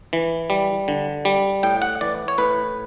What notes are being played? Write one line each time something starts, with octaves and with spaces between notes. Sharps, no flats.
E3
G3
D3
G3
A2 G5
F#5
E3 D5
C#5
A2 B4